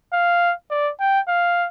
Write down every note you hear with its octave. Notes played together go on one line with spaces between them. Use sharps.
F5
D5
G5
F5